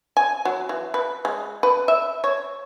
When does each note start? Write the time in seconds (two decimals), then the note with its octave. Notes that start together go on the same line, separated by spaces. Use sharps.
0.17 G#5
0.45 F#3
0.69 E3
0.94 B4
1.25 G#3
1.63 B4
1.88 E5
2.24 C#5